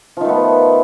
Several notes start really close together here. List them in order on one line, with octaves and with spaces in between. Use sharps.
F3 D#3 A3 B3